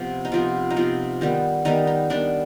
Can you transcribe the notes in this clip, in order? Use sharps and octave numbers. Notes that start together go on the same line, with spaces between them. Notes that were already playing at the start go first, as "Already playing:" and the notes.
Already playing: C3 F3 B3
D#4
C3 F3 B3 F4
D#4
C3 F3 B3 F4
D#3 G3 B3
D#3 G3 B3 D#4
D#4
D#3 G3 B3 D4